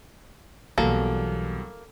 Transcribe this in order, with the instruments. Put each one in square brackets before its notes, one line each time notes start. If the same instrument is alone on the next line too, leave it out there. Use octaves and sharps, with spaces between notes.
[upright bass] B1 E3 [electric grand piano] E2 F#3 G3 [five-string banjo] A#3 [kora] A4